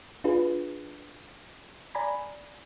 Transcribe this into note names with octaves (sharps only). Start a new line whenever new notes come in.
D4 F4 G#4 B4
D5 G#5 A#5 B5